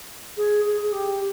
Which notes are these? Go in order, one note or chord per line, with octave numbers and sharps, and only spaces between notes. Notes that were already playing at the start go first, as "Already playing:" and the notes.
G#4
G#4
G#4
G4